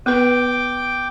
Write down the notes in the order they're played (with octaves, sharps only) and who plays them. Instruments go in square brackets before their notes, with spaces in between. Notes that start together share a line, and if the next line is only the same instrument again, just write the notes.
[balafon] B3 B4 [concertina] G5 D6